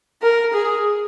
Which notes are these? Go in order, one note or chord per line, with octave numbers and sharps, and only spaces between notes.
A#4
G#4